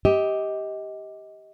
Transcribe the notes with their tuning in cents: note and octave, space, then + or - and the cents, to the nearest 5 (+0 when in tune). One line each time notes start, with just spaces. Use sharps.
G4 +0 D#5 +25